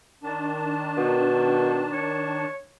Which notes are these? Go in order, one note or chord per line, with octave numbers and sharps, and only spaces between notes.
D#3 D4 A5
B2
C#5